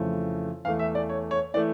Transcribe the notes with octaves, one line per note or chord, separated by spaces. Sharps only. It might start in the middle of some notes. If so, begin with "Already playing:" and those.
Already playing: F2 C#3 E3 A3
E2 E3 A3 F5
E5
D5
C#5
C#5
E3 A3 D5